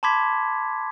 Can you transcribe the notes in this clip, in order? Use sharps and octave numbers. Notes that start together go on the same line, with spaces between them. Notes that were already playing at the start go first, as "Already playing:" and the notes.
A5 B5 C6 D6 G#6 B6